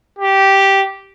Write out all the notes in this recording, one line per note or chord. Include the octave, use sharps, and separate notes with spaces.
G4